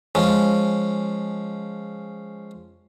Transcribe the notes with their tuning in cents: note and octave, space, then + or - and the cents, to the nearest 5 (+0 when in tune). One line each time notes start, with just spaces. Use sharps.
F3 +0 G#3 -5 C#4 +0